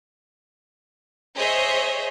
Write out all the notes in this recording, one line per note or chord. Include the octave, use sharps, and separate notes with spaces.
G#4 C5 C#5 D#5 E5